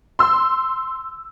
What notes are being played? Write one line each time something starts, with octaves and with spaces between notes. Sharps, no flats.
C6 E6